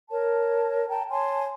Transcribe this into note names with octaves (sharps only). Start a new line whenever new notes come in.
A#4 C#5 A5
G5 A5 A#5
C#5 G#5 A5 C6